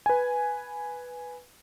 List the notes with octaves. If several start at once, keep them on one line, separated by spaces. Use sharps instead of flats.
B4 G#5